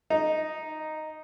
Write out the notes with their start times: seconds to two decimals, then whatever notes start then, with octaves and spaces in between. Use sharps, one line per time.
0.10 D#4